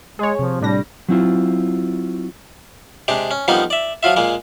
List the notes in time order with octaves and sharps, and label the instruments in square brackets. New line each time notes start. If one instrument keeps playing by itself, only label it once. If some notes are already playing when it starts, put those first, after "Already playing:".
[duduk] G#3 [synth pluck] G#4 C#5
[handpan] C3 [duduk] F3
[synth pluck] A2 D4 A#6 [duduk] G3
[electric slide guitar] F#3 C4 E4 F4
[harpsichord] C3 G#3 D4 G4
C#4
F2 F3 G3 A#3 B3 D#4
D5 E5
F3 F#3 F4 E5
A#2 G#3 A#3